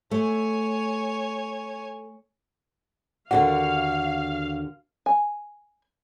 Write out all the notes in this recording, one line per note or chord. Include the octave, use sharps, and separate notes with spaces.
A3 C#5 G#5
D#2 D3 F#4 F5 F#5
G#5